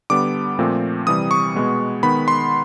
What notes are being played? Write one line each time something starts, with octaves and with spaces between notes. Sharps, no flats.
D3 G3 B3 D6
A#2 F3 A3 C4
C3 E3 G3 D#6
C#6
B2 G#3 B3
D#3 G#3 B3 B5
C6